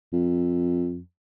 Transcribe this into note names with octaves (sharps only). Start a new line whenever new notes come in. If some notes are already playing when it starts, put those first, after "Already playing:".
F2